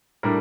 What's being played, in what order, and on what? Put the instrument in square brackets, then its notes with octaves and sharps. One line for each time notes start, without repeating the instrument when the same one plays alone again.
[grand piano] A2 G3 D4 A#4